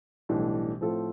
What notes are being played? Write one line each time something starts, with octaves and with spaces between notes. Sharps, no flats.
B1 A2 E3 G3 D4
A2 F3 C4 F4 A4